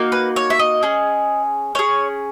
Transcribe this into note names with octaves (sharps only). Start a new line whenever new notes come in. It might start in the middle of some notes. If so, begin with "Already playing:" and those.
Already playing: A#3 D#4 F#4
B4
C#5
E5
D#5
C#4 G#4
C#4 G#4 C#5